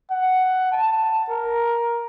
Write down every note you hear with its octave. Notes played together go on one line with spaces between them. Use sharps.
F#5
A5
A#4